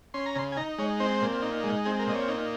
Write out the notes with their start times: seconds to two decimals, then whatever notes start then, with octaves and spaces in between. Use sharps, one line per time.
0.14 C#4 C6
0.26 A#5
0.36 C#3 C6
0.52 G#5
0.57 D#4 A#5
0.78 G#3 C#5
1.00 C4 C5
1.22 A#2
1.42 D#4
1.64 G#3
1.85 C4 G#4
1.99 A#4
2.07 A#2 D#5
2.15 C#5
2.28 D#4